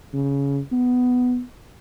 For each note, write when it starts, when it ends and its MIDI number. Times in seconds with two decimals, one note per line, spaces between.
0.13 0.60 49
0.72 1.41 59